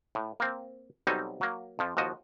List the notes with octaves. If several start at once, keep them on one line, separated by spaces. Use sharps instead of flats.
A2
A#3 C4
B1 F#3 G3 C4 D#4 A4
F#3 A#3
F2 F3
D#2 F3 F#4 D#5